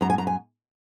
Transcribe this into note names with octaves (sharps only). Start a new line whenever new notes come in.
F#2 A#5
G#5
F#2 A#5
G#5